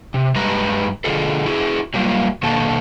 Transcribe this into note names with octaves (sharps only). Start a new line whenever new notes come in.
C3
G2 G3 G#3 B4 A#5
D3 F4 G#4 A4
E4 F#4 G#4
F#3 G3 A#3 F4
B2 D#3 A#3 F#4 A4